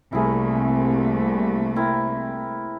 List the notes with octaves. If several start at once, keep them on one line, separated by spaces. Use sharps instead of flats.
C2 A3 A#3 E4 G#4 A#4
C4 E4 A#4